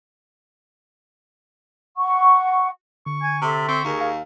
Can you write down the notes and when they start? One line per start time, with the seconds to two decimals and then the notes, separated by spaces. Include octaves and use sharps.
1.97 F#5 C#6
3.06 D3 C#6
3.21 G#5 G#6
3.42 C3 A4 E5 C6
3.68 C4 C#6
3.84 D#2 G#4 A#4
4.01 F5